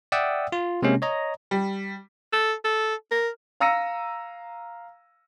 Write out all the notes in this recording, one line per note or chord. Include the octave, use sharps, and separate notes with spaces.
D5 E5 F#5 G5 D#6 E6
F4
C3 G#3 A#3 C#4
C#5 D#5 A#5
G3
A4
A4
A#4
F5 A#5 E6 A#6 C#7 D#7